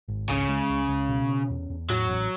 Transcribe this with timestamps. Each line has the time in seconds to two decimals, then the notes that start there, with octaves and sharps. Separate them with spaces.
0.08 G#1
0.29 C#2 C#3
0.49 G#3
0.70 C#2
0.89 C#2
1.09 B2
1.29 C#4
1.50 E2
1.70 E2
1.89 A2 F#3
2.10 A1